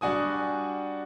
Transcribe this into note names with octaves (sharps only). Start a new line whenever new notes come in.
G3 D4 F#4 G#5 D#6